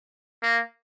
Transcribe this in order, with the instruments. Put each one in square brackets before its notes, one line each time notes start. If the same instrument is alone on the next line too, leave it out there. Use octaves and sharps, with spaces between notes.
[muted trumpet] A#3